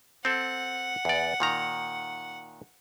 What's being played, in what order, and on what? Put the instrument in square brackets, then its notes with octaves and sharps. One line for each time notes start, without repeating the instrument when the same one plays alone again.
[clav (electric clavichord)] C4 A4 [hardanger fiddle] F#5
[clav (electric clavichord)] E2 D5
A#2 D#3 A#5